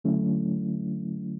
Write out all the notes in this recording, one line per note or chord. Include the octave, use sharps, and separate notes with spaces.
D3 F#3 A3 C#4 E4